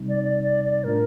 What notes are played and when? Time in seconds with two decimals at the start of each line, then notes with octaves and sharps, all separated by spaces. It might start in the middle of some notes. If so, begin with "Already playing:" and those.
Already playing: C3 G3 C4 D#4
0.09 D5
0.23 D5
0.43 D5
0.64 D5
0.84 A2 A3 D4 F4 A#4